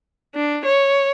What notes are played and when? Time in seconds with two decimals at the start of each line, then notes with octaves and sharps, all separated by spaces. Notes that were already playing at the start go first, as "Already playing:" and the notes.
0.35 D4
0.65 C#5